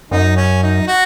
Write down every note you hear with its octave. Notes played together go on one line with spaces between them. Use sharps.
F#2 D#4
C#4
D#4
F#4